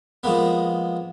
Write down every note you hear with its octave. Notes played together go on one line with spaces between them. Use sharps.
F3 G#3 A#3 B3